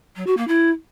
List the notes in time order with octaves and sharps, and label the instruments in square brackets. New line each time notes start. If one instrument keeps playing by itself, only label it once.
[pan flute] F#3
F#4
A#3
E4